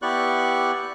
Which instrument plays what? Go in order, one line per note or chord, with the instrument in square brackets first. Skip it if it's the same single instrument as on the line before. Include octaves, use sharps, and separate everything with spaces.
[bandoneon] B3 E4 G4 D5 C#6 F#6